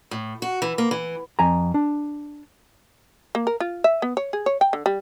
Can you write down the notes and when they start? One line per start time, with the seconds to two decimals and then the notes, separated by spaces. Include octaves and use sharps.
0.11 A2
0.42 F#4
0.62 E3
0.78 A#3
0.91 E3
1.39 F2 G#5 A#5
1.74 D4
3.35 A#3
3.47 A#4
3.60 F4
3.84 E5
4.02 B3
4.17 C#5
4.33 G#4
4.46 C#5
4.61 G5
4.73 D3
4.86 G3